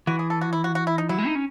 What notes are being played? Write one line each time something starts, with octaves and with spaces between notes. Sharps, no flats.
E3 F#4
G#4
A4
F#4
E4
F#4
F#4
E4
D#4
F#3 E4
G#3
D#4
C#4